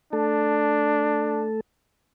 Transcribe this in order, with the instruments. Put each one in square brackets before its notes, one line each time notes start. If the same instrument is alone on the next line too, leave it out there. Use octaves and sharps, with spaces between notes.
[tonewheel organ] A3 A4 [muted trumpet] D4